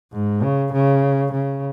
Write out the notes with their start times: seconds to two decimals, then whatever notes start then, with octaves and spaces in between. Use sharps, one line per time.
0.12 G#2
0.42 C#3
0.73 C#3
1.32 C#3